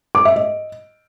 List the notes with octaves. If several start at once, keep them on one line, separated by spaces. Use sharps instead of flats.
D6
E5
D#5